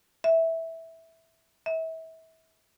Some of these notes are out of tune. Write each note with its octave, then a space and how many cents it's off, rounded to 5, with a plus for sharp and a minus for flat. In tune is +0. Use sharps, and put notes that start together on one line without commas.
E5 -10
E5 -35